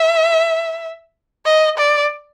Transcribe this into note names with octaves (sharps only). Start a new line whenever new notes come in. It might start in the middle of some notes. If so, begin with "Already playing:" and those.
Already playing: E5
D#5
D5